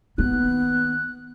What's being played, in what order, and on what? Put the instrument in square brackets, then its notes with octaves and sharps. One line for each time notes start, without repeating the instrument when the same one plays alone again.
[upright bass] D#3 A#3 [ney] B3 [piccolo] F#6